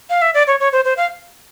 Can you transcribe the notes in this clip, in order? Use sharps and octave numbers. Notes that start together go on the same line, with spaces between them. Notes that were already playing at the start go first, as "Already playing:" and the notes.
F5
E5
D5
C#5
C#5
C5
C5
F5